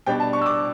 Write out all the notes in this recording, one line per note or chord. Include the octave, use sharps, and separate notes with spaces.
B2 G3 D4 G5
A5
C#6
E6
D6